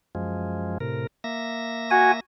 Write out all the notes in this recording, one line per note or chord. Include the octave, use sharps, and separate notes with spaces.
F#2 F3 G#3
A2 C3 A#4
A#3 E5 A#6
F#4 G#5